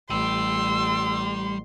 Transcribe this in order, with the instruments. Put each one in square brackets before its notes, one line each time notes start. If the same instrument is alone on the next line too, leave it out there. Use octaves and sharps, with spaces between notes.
[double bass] A1 [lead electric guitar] G3 [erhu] C6 [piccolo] E6